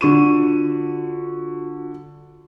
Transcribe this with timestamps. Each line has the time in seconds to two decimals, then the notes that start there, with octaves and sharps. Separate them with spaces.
0.01 D3 F4 F#4 C#6 D#7